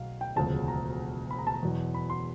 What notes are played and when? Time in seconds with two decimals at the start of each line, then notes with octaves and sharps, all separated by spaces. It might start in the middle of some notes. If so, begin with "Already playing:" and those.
Already playing: B1 B2 F5
0.21 G5
0.36 E1 D2 C#3 F3 A5
0.68 A#5
1.31 B5
1.38 A#5
1.47 A5
1.54 A#5
1.63 E2 B2 F#3
1.94 B5
2.10 C6